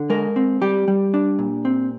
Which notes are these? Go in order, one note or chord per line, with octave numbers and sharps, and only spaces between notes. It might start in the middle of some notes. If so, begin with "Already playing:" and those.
Already playing: D3
G#3 A#4
C4
G3 G4
G3
D4
A#2
C4